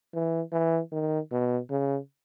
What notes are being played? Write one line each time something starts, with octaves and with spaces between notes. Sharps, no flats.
E3
E3
D#3
B2
C#3